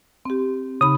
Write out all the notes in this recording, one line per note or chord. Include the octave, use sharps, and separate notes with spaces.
C4 G4
C#3 D#4 B5 D#6